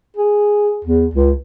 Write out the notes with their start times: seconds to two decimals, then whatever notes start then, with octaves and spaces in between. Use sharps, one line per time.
0.17 G#4
0.84 E2
1.14 C#2